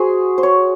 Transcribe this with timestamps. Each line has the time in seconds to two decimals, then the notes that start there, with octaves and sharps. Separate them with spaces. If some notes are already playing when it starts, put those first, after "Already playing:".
Already playing: F#4 G#4 C5
0.38 C5
0.43 C#5